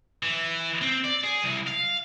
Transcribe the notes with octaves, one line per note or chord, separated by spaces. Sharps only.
E3
C4
D5
G#4
C2
F5